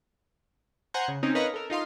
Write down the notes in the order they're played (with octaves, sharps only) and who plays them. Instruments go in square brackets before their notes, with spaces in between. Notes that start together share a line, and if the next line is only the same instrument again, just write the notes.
[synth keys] C5 F#5 G#5 A#5 C6 G6
C#3
C4 C#4 D#4
A#4 B4 C#5 D#5 F5 A#5
A4 A#4
D#4 F4 F5 C6